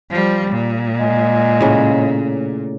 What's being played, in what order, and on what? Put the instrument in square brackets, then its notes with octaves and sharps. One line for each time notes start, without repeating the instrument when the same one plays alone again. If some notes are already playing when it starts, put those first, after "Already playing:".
[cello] F3 G3
A#2
[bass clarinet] G#3
[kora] A2 C#3